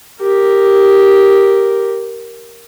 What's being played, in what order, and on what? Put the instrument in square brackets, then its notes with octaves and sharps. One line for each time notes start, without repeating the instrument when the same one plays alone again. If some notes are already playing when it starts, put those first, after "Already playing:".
[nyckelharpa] G4 A#4